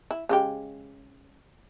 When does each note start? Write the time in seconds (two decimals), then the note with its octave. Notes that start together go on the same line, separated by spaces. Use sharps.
0.11 E4
0.29 C#3 G#3 G4